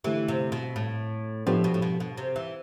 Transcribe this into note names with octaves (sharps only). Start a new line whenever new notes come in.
D3 E3 A3 E4 G4
C3
B2
A2
A2 F3 B3 D4 G4 C5
B2
A2
B2
B2
C3
E3